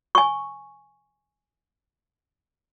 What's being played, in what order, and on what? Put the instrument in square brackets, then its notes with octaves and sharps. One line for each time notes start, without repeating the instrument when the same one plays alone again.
[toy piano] G#5 C#6